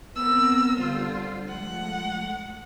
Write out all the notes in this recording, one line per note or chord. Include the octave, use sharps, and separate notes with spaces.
B3 C4 A#4 E6
D3 G3 F4 C5
F3 G#3 A3 F#5